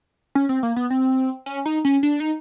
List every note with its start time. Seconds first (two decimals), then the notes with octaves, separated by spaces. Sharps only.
0.35 C#4
0.49 C4
0.63 A#3
0.76 B3
0.90 C4
1.46 C#4
1.66 D#4
1.85 C#4
2.03 D4
2.20 D#4